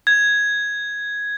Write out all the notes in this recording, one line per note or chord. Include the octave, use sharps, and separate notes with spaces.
G#6